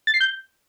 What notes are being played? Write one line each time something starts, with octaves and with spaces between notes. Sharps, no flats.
A6
C7
G6